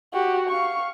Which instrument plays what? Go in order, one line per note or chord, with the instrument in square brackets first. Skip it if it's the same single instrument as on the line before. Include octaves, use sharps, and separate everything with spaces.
[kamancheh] F#4 G4
F5 C#6